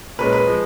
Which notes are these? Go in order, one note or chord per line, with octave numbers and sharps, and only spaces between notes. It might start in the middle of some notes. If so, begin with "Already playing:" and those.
A#2 G#3 C#4 B4
B4
F3 G#3